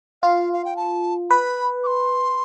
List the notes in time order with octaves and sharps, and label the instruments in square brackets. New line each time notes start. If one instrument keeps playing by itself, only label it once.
[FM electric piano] F4 [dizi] F5
[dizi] F5
G5
A5
[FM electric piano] B4 [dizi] B5
[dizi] D6
C6